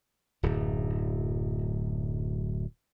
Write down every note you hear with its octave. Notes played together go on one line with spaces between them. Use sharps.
D1 F#2